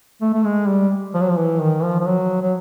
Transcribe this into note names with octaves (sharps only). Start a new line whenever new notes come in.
A3
A3
G#3
G3
F3
F#3
F3
E3
D#3
F3
F3
F#3
F#3